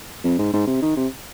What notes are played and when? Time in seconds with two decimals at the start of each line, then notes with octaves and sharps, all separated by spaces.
0.24 F2
0.39 G#2
0.53 G#2
0.67 C3
0.82 D#3
0.97 C3